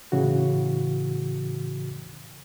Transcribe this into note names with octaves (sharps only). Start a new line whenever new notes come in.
A2 C#3 E3 F#4